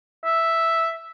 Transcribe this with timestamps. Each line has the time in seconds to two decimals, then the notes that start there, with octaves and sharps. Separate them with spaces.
0.24 E5